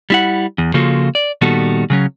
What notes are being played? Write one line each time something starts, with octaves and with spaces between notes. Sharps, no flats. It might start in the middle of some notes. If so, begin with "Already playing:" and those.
G3 E4 F#5
E2
C#3 F3 A#3 F4 F#4 A4
D5
A#2 D#3 G3 B3 F#4 A4
C#3 F#3 C#4